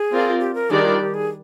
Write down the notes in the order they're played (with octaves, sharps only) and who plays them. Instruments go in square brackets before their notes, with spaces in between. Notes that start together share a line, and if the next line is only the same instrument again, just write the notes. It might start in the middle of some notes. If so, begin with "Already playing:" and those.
Already playing: [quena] G#4
[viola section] C4 F4 A#4 D5
[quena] G4
A#4
[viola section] D#3 G3 D4 G4 D5 [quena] G#4
[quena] F4
G4
G#4